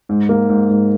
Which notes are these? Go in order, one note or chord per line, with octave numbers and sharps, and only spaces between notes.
G#2
A#3
G#2
G#2